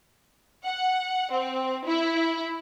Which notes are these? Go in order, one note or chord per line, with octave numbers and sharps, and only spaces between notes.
F#5
C4
E4